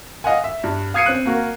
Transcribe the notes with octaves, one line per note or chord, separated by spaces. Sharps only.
D#5 F5 F#5 G#5
E5
G2
F5 D#6 G#6 C7 C#7 D#7
C4 F#6
A#3 F#4 A#4